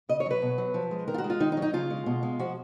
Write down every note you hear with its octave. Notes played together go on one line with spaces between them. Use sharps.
C#3 D#5
C#5
F#3 B4
B2
F#3
F3
G#3
D#3 A#4
F4
F#4
G#3
F4
D#3 D#4
D#4
F#3
D#4
C#3 F4
G#3
B2
G#3
F3 F#4